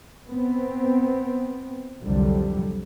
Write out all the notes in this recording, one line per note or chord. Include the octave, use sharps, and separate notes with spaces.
B3 C4
C2 F2 D3 F#3 G3